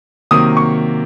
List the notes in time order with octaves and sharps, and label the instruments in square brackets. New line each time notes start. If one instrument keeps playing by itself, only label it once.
[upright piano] C3 D#3 F#3 A#3 [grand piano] D#6
[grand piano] C#6